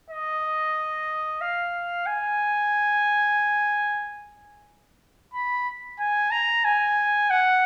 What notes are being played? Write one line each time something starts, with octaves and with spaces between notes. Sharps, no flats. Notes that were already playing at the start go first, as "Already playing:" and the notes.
D#5
F5
G#5
B5
G#5
A#5
G#5
F#5